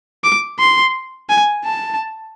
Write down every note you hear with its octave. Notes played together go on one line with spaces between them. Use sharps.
D6
C6
G#5
A5